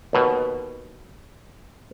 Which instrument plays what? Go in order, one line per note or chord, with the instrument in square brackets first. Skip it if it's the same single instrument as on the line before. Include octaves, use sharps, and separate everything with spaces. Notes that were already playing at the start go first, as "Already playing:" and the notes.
[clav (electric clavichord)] D#2 B2